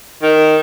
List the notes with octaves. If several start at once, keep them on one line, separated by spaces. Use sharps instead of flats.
D#3